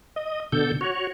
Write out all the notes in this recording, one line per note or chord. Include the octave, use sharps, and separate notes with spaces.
D#5
B2 D3 A4 G6
F#4 C#5